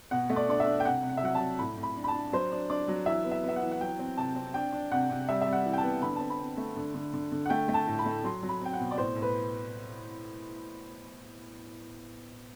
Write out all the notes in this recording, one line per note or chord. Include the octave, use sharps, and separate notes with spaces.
B2 F#5
A3
D5
D4 D5
E5
D4
G5
C3 F#5
C3
F#5
E5
F#3 F#5
F#3 A5
A2 B5
A2
B5
D4
B5
A5
D4
F#3 C5
D4
D4 D5
F#3
E3 E5
B3
E5
B3 E5
F#5
E3
F#5
F#3 G5
C4
C3 A5
C4
D4 G5
D4
C3 F#5
C3
G3 E5
G3 E5
F#5
E3
G5
A5
B3
D3 B5
C4 A5
B5
C4
A3
D3
D3
D3
D3
F#5
A3 G5
A3
A5
A2
B5
A3
F#3 C6
F#3
B5
C4 G5
F#5
B2
D5
A2 C5
A2
B4